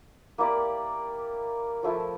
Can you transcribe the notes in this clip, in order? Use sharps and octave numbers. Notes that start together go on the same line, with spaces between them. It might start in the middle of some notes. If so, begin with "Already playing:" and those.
A#3 E4 G4 D5
F3 A3 E4